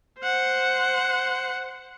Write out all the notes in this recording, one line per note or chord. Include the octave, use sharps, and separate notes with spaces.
C5 F#5